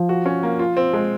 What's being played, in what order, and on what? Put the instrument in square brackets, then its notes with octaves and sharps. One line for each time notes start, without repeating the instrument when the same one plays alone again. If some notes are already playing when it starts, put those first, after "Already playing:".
Already playing: [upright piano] F3
[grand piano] F#4
C#4
A#3
F4
C4
G#3